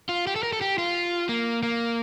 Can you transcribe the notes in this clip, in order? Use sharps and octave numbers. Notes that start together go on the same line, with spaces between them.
F4
G4
A4
A#4
A4
G4
F4
A#3
A#3